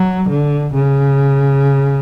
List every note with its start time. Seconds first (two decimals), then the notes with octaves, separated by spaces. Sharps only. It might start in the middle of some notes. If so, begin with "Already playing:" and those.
Already playing: F#3
0.29 D3
0.74 C#3